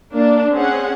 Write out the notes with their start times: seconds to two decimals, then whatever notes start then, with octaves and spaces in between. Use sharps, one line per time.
0.14 A#3 D4
0.52 C4 C#4 G#4 F#5